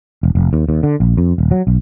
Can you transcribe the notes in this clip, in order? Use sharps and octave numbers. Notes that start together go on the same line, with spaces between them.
E1
F1
D#2
D#2
D3
A#1
F2
D#1
F#3
B1